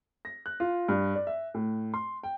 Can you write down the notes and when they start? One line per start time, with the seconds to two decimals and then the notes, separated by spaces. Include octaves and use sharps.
0.25 A#6
0.46 F#6
0.60 F4
0.88 G2
1.16 D5
1.27 E5
1.54 A2
1.94 C6
2.23 G5